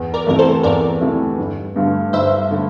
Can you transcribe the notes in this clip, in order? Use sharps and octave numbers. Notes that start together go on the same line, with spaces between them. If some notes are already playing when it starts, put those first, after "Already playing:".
Already playing: E2
A#4 D5
C3 E3 A3 A#4
A4 C5
E2 A#4 D5
C3 E3 A3
G1
G2 D3 A3
G1 C5 E5
D3 A3